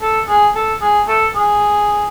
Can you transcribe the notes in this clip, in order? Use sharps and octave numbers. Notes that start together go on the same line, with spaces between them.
A4
G#4
A4
G#4
A4
G#4